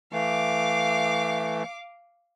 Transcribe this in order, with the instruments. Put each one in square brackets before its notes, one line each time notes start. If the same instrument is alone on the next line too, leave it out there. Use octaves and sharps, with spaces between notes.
[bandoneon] E3 A3 [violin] F5 D6